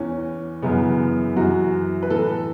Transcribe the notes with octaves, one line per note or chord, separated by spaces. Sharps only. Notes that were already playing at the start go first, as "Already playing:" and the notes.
Already playing: E2 E3 C#4
F#2 C#3 E3 B3
F#2 E3 F#4
B4
A2 E3 A4